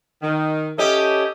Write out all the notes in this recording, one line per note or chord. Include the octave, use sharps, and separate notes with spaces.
D#3
C#4 G4 A4 D#5 E5